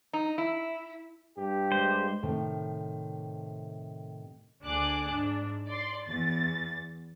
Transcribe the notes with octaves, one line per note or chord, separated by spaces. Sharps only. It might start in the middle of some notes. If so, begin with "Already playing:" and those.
D#4
E4
G2 G4
G#3 C5
A2 C3 D#3
D2 D4 G#4 D6 F#6
G#2 D4
D5 C6
E2 A6